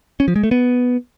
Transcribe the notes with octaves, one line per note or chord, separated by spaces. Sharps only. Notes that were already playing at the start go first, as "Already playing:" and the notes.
C#4
F3
G#3
A3
B3